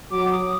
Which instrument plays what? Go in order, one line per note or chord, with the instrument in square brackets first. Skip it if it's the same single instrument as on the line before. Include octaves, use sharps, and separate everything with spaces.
[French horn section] F#3 [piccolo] D6
[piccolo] D#6